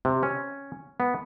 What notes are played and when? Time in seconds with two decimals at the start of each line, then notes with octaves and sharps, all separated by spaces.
0.05 C3
0.23 C#4
1.00 B3